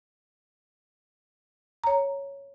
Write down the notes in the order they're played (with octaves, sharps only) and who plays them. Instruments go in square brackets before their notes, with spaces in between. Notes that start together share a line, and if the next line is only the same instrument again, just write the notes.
[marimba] C#5 A#5